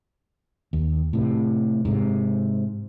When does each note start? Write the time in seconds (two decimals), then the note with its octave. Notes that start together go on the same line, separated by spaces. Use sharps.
0.73 D#2
1.13 A2 C3
1.85 G#2 C3